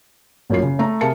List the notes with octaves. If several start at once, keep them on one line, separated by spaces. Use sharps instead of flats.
A1 F#2 A#3 F4 C7
C#3
A3 A#5
C3 G#4 A#4 F5 A5 C#7